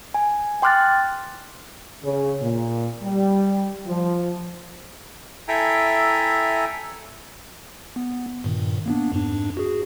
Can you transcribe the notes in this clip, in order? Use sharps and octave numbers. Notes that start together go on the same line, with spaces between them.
G#5
G5 C6 D6 F6 F#6 A6
C#3
A#2
G3
F3
E4 A4 E5 G5 G#5 A#5
B3
G2 A#2 D#3
A#3 B3 D4
F2 G#2 D4
F#4 G#4